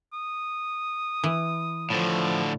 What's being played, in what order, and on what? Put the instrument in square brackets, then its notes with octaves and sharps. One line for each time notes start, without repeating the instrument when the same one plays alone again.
[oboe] D#6
[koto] E3
[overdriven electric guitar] A2 D3 [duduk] F3